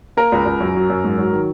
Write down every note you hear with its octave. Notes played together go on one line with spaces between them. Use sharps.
A#3 A#4
C#2
C#2
F#2
F#3
F#2
G#2
F#3
D#3